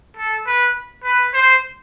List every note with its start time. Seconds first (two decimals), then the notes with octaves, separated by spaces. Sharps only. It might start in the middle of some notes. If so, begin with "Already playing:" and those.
0.17 A4
0.47 B4
1.04 B4
1.34 C5